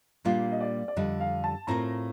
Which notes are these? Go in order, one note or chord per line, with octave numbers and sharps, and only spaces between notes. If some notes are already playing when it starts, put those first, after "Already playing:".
A#2 G3 A#3 D4 F4
D#5
D5
D5
F2 D3 G3 D4 D#5
F5
A5
A2 A3 C4 F4 A#4 A#5